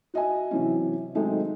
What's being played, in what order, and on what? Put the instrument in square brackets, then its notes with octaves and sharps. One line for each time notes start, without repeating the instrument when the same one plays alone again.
[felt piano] F#4 D#5 E5 G#5
C3 E3 F#3 C#4
D#3 F#3 G#3 A3 C4 D#4